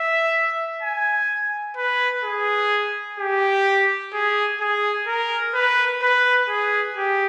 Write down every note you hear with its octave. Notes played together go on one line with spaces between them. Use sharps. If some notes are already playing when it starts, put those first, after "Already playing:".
Already playing: E5
G#5
B4
G#4
G4
G#4
G#4
A#4
B4
B4
G#4
G4